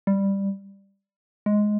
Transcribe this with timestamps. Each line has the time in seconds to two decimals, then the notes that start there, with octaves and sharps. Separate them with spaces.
0.07 G3
1.46 G#3